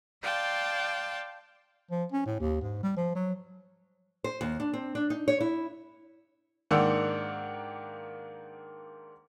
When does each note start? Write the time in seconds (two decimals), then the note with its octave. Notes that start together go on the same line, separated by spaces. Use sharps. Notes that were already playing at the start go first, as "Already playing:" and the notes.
0.23 D5 F5 G5 A5 C6
1.91 F3
2.12 C#4
2.26 A2
2.40 D#2
2.61 G#2
2.83 G3
2.96 F3
3.15 F#3
4.24 C5
4.41 D#2
4.60 D4
4.74 C4
4.95 D4
5.10 D#4
5.28 C#5
5.40 E4
6.71 G#2 D#3 A#3 D4 F#5 E6